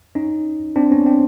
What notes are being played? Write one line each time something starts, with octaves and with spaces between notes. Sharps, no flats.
C#4 D#4
C4 D4
B3 C#4
C4 D4